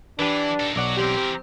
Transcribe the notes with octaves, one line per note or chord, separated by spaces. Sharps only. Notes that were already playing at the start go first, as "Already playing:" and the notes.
E3 D4 G4 B4
D#4 A4
B1 F#3 F#4 D5 F#5
E3 C4 G4 A#4